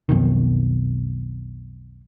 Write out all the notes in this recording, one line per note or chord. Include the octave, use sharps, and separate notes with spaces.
B1 F2 B2 D#3